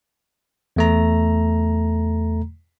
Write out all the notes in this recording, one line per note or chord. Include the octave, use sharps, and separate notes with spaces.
E2 A3 A#5